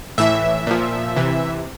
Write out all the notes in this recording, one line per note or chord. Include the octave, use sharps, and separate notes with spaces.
A2 E3 E5
A#2 F3
C3 E3